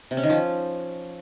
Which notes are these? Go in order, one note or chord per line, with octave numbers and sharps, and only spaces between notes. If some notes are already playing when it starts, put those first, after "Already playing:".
C3
C#4
D#3
F3